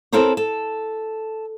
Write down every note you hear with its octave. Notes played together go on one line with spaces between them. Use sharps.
C4 E4 A4 A#4 C5 C#5
A4